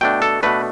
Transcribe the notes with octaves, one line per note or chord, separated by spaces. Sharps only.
B2 A3 D4 G5
A4
B2 A3 D4 B4